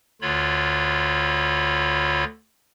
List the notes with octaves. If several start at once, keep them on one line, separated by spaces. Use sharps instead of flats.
D2 D3 F4 C#5 B5